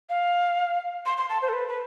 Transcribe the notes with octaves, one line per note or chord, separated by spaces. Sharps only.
F5
C6
C6
A5
C5
A4
B4
B4